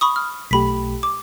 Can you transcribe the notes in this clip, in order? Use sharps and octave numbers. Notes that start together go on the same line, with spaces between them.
B5 C#6 D#6
F6
B1 A3 G4 B5 B6
D6